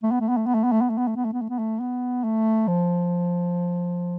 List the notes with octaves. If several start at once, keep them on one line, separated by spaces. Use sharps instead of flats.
A3
B3
A3
B3
A3
B3
A3
B3
A3
B3
A3
B3
A3
B3
A3
B3
A3
B3
A3
B3
A3
F3